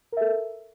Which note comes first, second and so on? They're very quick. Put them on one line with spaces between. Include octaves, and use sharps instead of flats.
A#4 E5 A4